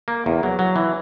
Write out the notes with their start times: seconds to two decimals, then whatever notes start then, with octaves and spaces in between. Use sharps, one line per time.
0.08 A#3
0.26 E2
0.43 F#3
0.59 F#3
0.76 E3